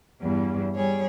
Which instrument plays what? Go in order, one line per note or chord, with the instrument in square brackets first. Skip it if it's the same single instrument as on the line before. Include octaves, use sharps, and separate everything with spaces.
[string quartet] E2 G2
G3 G#4 C#5